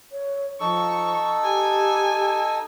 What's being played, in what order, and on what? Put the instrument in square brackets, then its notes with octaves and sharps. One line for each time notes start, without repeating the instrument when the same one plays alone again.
[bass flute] C#5
[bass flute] F3 [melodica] D#4 A4 E6 [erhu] C#6
[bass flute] G4 [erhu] G#5